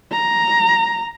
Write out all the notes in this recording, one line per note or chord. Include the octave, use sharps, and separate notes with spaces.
A#5